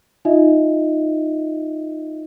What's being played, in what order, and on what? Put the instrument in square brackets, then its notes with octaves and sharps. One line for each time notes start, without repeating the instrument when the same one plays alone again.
[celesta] D#4 F4 D#5 E5